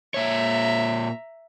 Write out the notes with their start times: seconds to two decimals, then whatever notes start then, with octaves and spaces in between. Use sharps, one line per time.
0.14 A#2 C#5 E5 A#5